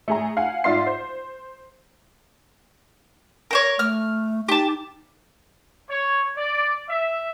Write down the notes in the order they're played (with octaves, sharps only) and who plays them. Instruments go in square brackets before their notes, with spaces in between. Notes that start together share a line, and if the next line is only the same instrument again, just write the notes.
[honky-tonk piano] A3 G#4 A#5
F5 F#5 G#5
G#2 F4 D5 E5 C6 C7
C5
[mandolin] A#4 C5 C#5
[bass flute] A3 [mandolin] F6
[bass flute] D#4 [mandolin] G4 A5
[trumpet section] C#5
D5
E5